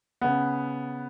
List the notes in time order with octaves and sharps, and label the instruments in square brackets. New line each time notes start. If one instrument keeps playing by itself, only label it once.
[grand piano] C#3 B3